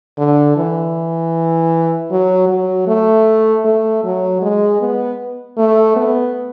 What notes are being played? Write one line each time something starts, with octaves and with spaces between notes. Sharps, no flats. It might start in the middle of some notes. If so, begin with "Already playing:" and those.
D3
E3
F#3
F#3
A3
A3
F#3
G#3
B3
A3
B3